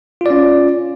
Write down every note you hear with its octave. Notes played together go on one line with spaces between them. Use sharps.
C#4 F4 D5